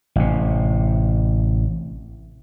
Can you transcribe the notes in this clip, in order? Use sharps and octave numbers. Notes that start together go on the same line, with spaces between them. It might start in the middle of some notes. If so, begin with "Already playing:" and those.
A1 C3